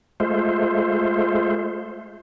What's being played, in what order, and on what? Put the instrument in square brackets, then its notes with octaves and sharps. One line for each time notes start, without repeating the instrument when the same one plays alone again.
[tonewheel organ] G#3 A3 F4 C5